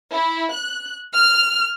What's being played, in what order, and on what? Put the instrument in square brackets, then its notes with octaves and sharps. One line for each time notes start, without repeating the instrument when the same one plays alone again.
[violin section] E4
F#6
F6